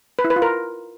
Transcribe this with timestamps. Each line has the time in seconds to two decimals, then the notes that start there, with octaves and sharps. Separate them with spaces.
0.19 B4
0.24 E4
0.30 B4
0.36 F4
0.42 A#4